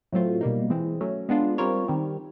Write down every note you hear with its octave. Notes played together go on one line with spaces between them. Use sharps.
A2 F#3 A3 C4 F4
B2 G3 A#3 D#4
E3 G#3 C4
F#3 A3 C#4
G#3 B3 D4 F4
G3 C4 F4 A#4 C#5
D#3 G3 C4